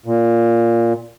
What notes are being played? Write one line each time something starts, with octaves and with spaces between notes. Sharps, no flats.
A#2